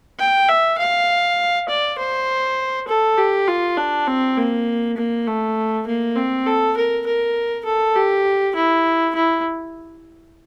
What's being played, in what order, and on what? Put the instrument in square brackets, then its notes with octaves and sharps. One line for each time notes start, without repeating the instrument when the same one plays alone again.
[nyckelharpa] G5
E5
F5
D5
C5
A4
G4
F4
D4
C4
A#3
A#3
A3
A#3
C4
A4
A#4
A#4
A4
G4
E4
E4